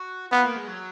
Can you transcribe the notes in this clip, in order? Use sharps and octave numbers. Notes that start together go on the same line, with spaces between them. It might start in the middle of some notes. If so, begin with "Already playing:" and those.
Already playing: F#4
B3 F4
A#3
G#3
F#3